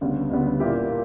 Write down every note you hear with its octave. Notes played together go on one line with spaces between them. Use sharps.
D2 C#3 G3 B3
D2 C#3 G3 B3
A#2 A#3 E4 G4
A#2